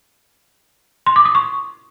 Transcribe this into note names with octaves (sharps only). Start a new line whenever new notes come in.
C6
D6
D#6
C#6